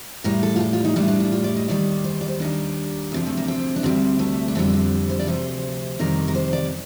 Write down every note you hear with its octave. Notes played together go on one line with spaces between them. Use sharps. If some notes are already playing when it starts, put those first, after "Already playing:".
A2 G3 A#4
A4
F4
G4
F4
D#4
A2 G3 D4
D4
D4
F4
D5
D#5
D#2 D#3 G3 D5
C5
D5
C5
D#2 D#3 G3 D4
D2 C3 F3
A3
A#3
C4
D4
D2 C3 G3 C4
A3
D4
F2 D3 G3 C4
C4
C5
D5
D2 C3 F3 C5
F2 C3 D#3 G3 A#4
A#4
C5
D5